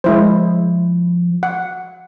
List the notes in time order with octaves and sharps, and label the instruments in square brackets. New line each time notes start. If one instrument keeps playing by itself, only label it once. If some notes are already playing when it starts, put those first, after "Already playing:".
[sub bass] F3 [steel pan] G#3 E4 C5
[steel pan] F#5